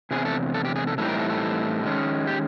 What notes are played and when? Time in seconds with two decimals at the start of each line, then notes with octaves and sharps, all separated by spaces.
0.11 E2 C3 G#4
0.25 A4
0.54 A4
0.65 G4
0.76 G#4
0.87 A4
0.98 A2 E3 G3 C4 D#4 A4
1.08 A#4
1.19 A4
1.30 A4
1.83 D#3 G#3 C#4
2.27 G4